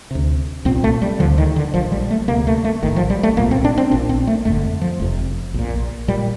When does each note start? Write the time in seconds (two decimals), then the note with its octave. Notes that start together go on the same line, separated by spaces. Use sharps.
0.11 D2 C3
0.65 C2 A#2 C4
0.84 A3
1.02 G3
1.19 D2 D3 F3
1.38 D#3
1.56 D3
1.74 A#1 A#2 F3
1.92 G3
2.11 A3
2.28 D2 C3 A#3
2.47 A3
2.64 A3
2.83 A#1 A2 D#3
2.96 F3
3.10 G3
3.23 A3
3.37 C2 A#2 A#3
3.51 C4
3.64 D4
3.77 C4
3.91 A#1 A#2 D4
4.09 C4
4.27 A3
4.45 G1 F2 D3 A3
4.81 F3
5.00 F1 F2 C3
5.54 A#1 A#2
6.08 A#2 G3